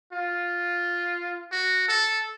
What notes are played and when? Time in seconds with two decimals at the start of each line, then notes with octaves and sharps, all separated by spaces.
0.13 F4
1.52 F#4
1.88 A4